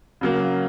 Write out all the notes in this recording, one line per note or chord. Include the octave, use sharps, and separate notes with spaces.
C#3 F#3 A#3